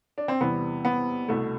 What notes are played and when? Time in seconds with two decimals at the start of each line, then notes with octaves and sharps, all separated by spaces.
0.18 D4
0.28 C4
0.41 E2 C3 E3 G3 B3
0.85 B3
1.28 C2 B2 A3